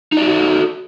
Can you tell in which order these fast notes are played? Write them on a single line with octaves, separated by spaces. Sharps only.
D#4 D5 G4 F#4 A4